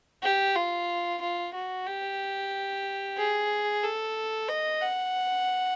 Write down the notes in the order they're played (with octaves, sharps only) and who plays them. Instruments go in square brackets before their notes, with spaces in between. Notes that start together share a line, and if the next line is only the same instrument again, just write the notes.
[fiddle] G4
F4
F4
F#4
G4
G#4
A4
D#5
F#5